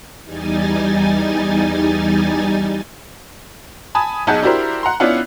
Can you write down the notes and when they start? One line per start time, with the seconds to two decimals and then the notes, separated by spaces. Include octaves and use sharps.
0.23 E2 G3 D#4 G#5 A6
3.95 G#5 A5 B5 D#6
4.27 B1 D#4 G#4 F#5 A5 G6
4.42 D4 E4 F#4 G4 A#4 C5
4.83 F#5 A#5 C6
5.00 B3 C#4 D4 E4 F4 F#5